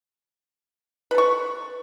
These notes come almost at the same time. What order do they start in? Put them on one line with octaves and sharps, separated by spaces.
B4 A4 C#6